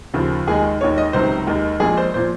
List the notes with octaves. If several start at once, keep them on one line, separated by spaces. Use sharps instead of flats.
D#2 C#3 F3
D#2 D#3 G#3 G#4
D#2 D#3 G#3 C#5
D#5
C#2 C3 D#3 F#3 C5
D#2 D#3 G#3
A#1 A#2 G#3 G#4
C5
A#2 F3 C5